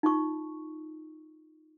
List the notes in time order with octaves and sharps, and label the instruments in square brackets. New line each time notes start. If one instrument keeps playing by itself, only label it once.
[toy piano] D#4 F4 C#6